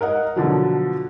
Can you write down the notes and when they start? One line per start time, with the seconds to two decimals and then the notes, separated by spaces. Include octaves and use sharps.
0.01 A#4 D#5 F#5
0.36 B2 D3 F3 F#3